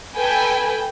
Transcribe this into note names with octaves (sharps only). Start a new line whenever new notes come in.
A4 B4 G5 G#5